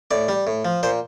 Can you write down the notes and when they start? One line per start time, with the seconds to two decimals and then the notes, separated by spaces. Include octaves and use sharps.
0.11 A2 D5
0.28 G3
0.47 A2
0.65 F3
0.83 A#2 C5